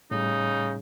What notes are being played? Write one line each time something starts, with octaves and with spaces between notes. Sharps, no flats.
A2 C#3 G3 D#4